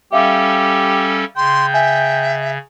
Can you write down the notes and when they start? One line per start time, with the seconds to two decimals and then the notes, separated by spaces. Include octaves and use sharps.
0.13 G3 C#4 G4 A4 E5 F5 D6
1.37 C#3 G5 C6
1.74 E5 G#5